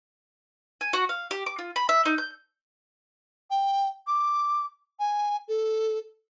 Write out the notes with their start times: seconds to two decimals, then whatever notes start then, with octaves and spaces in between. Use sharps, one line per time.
0.81 G#5
0.93 F#4
1.09 F5
1.31 G4
1.46 D6
1.59 F4
1.76 B5
1.89 E5
2.06 D#4
2.18 G6
3.51 G5
4.07 D6
5.00 G#5
5.48 A4